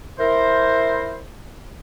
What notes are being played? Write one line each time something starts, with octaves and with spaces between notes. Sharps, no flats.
E4 A#4 C5